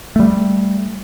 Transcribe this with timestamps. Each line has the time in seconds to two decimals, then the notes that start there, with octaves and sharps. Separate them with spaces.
0.16 G3 A3